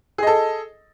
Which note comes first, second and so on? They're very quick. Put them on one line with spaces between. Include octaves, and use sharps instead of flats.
G#4 D#5 A4